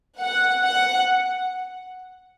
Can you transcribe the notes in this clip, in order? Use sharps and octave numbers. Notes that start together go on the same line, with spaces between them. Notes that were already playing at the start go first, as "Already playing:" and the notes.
F#5
F#5